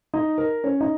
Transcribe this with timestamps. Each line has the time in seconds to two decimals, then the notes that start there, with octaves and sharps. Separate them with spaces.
0.14 D#4 D#5
0.38 A#4
0.64 C#4 C#5
0.81 D#4 D#5